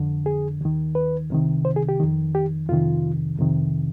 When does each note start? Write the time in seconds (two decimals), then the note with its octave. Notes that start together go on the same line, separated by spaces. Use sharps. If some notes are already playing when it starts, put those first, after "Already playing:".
Already playing: F2 D3
0.26 G#4
0.61 D#2 D#3
0.95 B4
1.30 C2 C3 D#3
1.65 C5
1.76 G#4
1.89 G4
2.00 F2 D#3
2.35 G4
2.69 F2 C3 D#3 F4
3.39 F2 C3 D#3